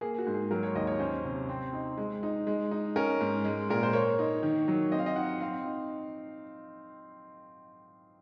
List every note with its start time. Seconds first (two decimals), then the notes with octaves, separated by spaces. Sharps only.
0.01 A#3 G#4
0.18 F#4
0.27 G#2
0.34 G#4
0.51 F#3 A#4
0.63 C#5
0.75 D#2 D#5
0.87 C#5
0.99 C#4 C5
1.25 C3
1.49 C4
1.73 D#4
1.97 G#3
2.23 D#4
2.47 G#3
2.71 D#4
2.96 C#4 A#4
3.21 G#2
3.45 G#3
3.70 A#2 A#4
3.83 C5
3.93 A#3 C#5
4.19 D#4
4.43 D#3
4.68 F#3
4.92 C4 D#5
4.99 F5
5.06 D#5
5.16 D#4 F#5
5.40 C4 F5
5.65 D#4